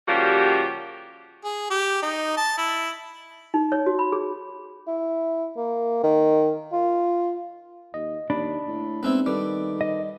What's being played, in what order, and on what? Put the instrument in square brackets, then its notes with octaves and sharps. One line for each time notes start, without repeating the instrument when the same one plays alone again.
[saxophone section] C#3 F3 G3 A#3 F#4 G4
[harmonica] G#4
G4
D#4
A5
E4
[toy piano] D#4
C#5
F#4
B5
G#4
[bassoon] E4
A#3
D#3
F4
[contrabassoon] D#2 [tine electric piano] D#5
[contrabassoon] D#2 [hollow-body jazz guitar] D4 [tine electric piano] B5
[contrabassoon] A2
[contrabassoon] G#2 [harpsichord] B3 C4 E4
[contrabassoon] D#3 [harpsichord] G3 [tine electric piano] A4 B4 D6
[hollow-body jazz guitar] D#5